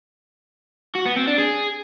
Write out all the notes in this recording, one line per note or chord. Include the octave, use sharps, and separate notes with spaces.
F#4
B3
C4
D4
G#4